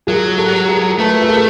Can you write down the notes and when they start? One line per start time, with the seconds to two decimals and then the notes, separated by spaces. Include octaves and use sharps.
0.07 F#3 G#4 A#4
0.38 G4 A4
0.69 G#4 A#4
0.99 A3 A4 B4
1.22 B4
1.29 G#4 A#4